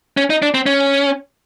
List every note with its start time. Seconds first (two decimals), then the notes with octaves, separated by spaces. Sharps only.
0.17 C#4
0.30 D#4
0.42 D4
0.54 C4
0.66 C#4